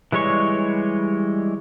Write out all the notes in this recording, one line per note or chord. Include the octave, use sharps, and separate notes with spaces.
E3 G3 G#3 C#5 C#6